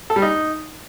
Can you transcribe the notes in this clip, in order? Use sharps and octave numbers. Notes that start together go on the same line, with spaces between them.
A4
G3
D#4